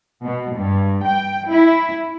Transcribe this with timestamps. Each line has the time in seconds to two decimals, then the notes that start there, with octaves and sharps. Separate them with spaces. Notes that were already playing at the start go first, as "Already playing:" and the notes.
0.24 B2
0.58 G2
1.06 G5
1.51 E4